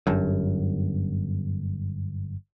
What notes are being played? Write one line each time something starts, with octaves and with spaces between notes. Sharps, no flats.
G1 F#2